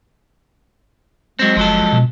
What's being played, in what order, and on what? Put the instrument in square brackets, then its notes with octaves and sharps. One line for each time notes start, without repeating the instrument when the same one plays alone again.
[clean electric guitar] F#3 C4 [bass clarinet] G#3
[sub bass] F#1 [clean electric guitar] F3 F#3 A4
[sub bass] B2